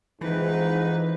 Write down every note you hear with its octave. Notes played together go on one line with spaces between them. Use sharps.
F2 G#2 E3 D#4 B4